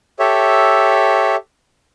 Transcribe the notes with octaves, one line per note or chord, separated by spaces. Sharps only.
G4 A4 C#5 E5